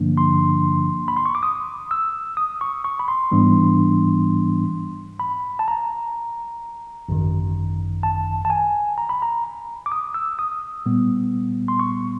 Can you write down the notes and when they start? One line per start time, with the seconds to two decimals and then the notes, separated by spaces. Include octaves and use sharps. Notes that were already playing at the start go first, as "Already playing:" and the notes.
Already playing: G2 D3 F3 A#3 D4
0.17 C6
1.08 B5
1.17 C6
1.26 C#6
1.35 D6
1.43 D#6
1.91 E6
2.37 D#6
2.61 C#6
2.84 C#6
2.99 B5
3.08 C6
3.31 G#2 E3 G3 B3 D4
5.20 B5
5.59 A5
5.68 A#5
7.09 G#1 F#2 D#3
8.03 A5
8.45 A5
8.50 G#5
8.98 A#5
9.09 B5
9.22 A#5
9.86 D6
9.92 D#6
10.14 E6
10.39 D#6
10.86 A#2 G3 B3
11.68 C6
11.80 C#6